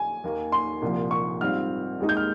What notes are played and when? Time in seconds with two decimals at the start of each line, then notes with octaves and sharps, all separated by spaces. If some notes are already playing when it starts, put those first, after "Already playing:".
Already playing: G#5
0.24 D#2 D#3 A#3
0.52 C6
0.82 C2 A#2 F3
1.11 C#6
1.41 G#2 G3 C4 F4 F6
2.00 D#2 D#3 G#3 D#4
2.09 G6
2.17 F6